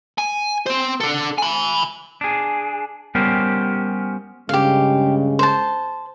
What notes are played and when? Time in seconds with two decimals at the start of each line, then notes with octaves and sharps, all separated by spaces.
0.18 G#5
0.67 C4 C5
1.01 D4 A4
1.38 G#5 B5
2.21 D4 G#4
3.15 G3 B3 C#4 G4 A#4 C5
4.49 G2 C#3 G#3 G4 F5
5.39 C5 A5